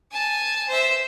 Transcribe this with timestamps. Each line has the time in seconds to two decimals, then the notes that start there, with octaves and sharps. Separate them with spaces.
0.11 G#5 A5
0.68 C5 E5